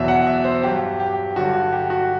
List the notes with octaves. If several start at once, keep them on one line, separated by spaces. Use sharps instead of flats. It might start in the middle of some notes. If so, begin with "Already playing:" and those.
Already playing: E2 B2 F#3 E5
F#5
E5
C5
G2 F#3 G4
G4
G2 D3 F#3 F#4
F#4
G4
F#4